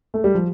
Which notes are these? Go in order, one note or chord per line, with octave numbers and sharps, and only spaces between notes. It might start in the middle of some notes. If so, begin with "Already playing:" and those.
A3
G3
F3